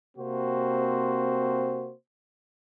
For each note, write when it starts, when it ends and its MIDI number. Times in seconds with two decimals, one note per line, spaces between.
0.17 1.92 48
0.17 1.92 58
0.17 1.92 60
0.17 1.92 66
0.17 1.92 72